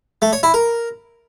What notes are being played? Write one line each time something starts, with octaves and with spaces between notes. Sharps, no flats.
A3
C#5
E4
A#4